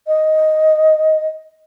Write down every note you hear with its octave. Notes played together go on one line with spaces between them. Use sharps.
D#5